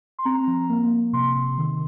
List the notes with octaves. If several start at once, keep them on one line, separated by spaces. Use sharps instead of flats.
C6
C4 A#5
F3
A#3
A#3
C3 C6
C3
D#3